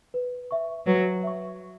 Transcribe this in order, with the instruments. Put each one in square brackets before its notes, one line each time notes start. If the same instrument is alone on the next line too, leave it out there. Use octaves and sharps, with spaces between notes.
[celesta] B4
E5 C#6
[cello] F#3 [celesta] B4
[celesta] E5 C#6